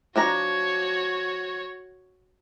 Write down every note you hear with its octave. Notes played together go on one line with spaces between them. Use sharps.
F3 D4 F#4 C#5 A#5